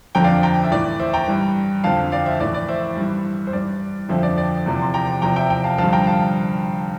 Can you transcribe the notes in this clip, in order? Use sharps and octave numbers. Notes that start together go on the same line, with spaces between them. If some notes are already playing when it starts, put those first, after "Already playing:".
F2 D3 F3 G5 A#5
D5 F5
G5 A#5
E5
A2 E3 D5
C5 E5
G5 A#5
G2 E3
F2 D3 F3 F5 A5
D5 F5
C5 E5
A2 E3 D5
D5
C5 E5
G2 E3
C5
G2 E3 D5
F2 D3 F3 C5 E5
D5
D5
E2 C3 F3
C6
G5 A#5
E2 C3 F3 G5 A#5
E5 G5
E5 G5
F5 A5
G2 D3 F3 F5 A5
G5 A#5
F5 A5